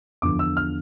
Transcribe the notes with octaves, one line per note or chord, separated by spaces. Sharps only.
E2 D3 F3 D6
E6
F6